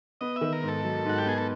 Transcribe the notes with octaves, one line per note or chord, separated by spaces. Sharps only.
B3 D#5
E5
D#3
A#4
G#2
A4
F#3
G#2 F#4
G4
B3 G#4
A4